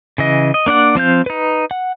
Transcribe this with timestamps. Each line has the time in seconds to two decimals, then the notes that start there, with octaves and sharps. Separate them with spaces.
0.18 C#3 E3 D#5
0.54 D#5
0.66 A#3 D4 D5 F#5
0.95 F3 C4 F5 G6
1.26 D#4 B4
1.71 F#5